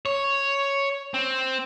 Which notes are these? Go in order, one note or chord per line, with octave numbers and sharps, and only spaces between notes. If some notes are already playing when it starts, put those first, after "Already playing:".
C#5
C4